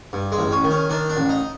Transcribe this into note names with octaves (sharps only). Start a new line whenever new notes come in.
G2
G#3
A1
C#4
D#3
C#4
D#3 D4
D4
A1
D#4